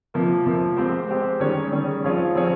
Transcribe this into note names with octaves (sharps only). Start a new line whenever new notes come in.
C3 F3 A#3
C3 F3 A#3
G#3 C4 G4 C5
G#3 C4 G4 C5
D#3 G3 C#4 G#4 C#5
D#3 G3 C#4 G#4 C#5
F3 C4 F4 G#4 C#5
F3 C4 F4 G#4 C#5